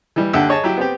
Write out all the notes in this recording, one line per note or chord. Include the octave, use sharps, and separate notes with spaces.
E3 G3
D#2 D3 G4 E5 F#5 E6
G#4 C#5 D#5 A5
F#3 E4 G4
B3 C4 G4